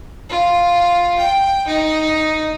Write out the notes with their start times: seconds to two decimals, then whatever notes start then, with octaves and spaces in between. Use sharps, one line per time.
0.29 F4
1.18 G5
1.67 D#4